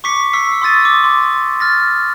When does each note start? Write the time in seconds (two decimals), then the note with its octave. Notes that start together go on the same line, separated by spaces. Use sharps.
0.04 C#6 D6 B6 C#7
0.33 C#6 E6 B6 C7
0.62 C6 D#6 E6 A6 D#7
0.85 D6
1.04 C6 D6
1.60 F6 A6 A#6